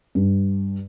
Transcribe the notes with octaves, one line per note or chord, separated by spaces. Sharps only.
G2